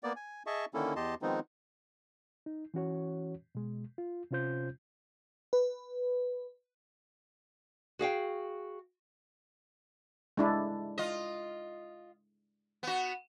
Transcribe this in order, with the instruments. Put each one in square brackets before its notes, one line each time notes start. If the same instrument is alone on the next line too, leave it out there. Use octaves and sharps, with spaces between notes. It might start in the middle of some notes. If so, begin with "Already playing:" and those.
[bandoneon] A#3 B3 D5
G#5
G#4 D#5 E5 A5 C#6
D3 D#3 A#3 C#4 E4 A4
E2 G4 D#5 A5 C6
D#3 F3 G#3 B3 C4 D#4
[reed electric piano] D#4
E3 C#4 F#4 C#5
B2 G#3
F4
C3 C#4 F4 C5 G6
[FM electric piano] B4
[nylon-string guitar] F#4 G#4 F5 G5
[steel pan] G#3 D4 E4
[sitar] F4 D#5
B3 F#4